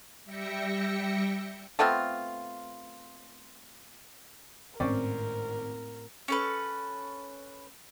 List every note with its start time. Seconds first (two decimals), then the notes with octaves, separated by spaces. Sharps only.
0.25 G3 E5 G5 A#6 C#7
1.79 A3 B3 C4 F4
4.80 G#1 A2 C4 C#4 A#4 D5
6.28 C#4 A4 B4